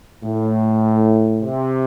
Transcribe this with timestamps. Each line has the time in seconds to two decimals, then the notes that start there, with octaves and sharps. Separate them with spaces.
0.23 A2
1.41 C3